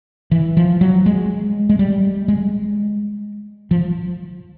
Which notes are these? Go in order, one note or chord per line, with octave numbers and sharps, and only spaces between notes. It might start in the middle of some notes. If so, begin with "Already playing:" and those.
E3
F3
F#3
G#3
G#3
G3
G#3
F3